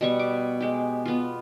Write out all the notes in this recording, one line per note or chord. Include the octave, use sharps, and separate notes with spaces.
B2 G3 C#6
D6
G#3 G4
B3 F4